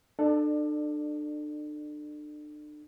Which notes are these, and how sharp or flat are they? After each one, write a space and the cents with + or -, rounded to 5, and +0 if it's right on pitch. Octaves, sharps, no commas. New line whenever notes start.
D4 +35 A4 +0 D5 +25